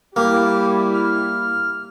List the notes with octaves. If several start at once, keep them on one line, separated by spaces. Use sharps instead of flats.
G3 A#3 E4 G4
F6